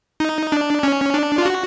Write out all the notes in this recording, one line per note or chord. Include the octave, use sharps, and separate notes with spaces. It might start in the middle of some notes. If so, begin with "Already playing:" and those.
D#4
D4
C#4
D4
F4
F#4